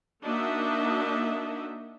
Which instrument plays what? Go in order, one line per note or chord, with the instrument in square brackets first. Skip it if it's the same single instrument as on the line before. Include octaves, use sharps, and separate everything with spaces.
[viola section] A#3 D4 D#4 F#4 D#5 E5